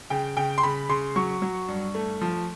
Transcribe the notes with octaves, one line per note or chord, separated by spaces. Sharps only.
C#3 G5
C#3 G5
C6
C#3 B5
C#3 C6
F#3 C#6
F#3
G2
A3
F3